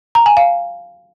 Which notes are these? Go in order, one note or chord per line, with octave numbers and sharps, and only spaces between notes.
A#5
G#5
F5